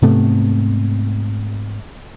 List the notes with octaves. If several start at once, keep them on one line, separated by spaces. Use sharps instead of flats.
G#2 C3 A3 B3